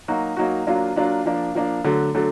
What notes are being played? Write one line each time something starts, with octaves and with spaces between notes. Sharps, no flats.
F#3 A#3 D#4 F#4
F#3 A#3 D#4 F#4
F#3 A#3 D4 F4
F#3 A#3 D4 F4
F3 A#3 D4
F3 A#3 D4
D3 F#3 A3
D3 F#3 A3